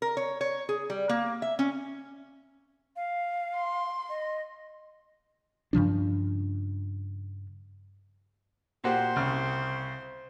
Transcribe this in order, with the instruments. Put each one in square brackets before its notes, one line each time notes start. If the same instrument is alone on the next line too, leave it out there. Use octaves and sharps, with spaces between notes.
[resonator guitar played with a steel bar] A#4
C#5
C#5
G#4
G3
A#3
E5
C#4
[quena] F5
[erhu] C6
[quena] D#5
[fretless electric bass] G2 C#3 F3 D4
[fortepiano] A#2 F#4 G4 [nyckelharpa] C5
[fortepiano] C2 C#3 F6